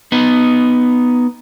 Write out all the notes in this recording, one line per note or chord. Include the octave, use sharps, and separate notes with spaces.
B3 D#4